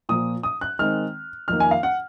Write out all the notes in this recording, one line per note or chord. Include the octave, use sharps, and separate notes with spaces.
A#2 F3 A#3 D#6
D#6
F#6
D#3 G#3 C4 F6
F2 D#3 A#3 F6
G#5
F5
F#5